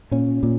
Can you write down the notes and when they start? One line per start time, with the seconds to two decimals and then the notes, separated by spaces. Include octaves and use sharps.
0.11 A#2 C#4
0.43 A#2